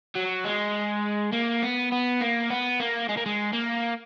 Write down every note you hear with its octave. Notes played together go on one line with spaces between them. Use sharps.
F#3
G#3
A#3
B3
B3
A#3
B3
A#3
G#3
A#3
G#3
A#3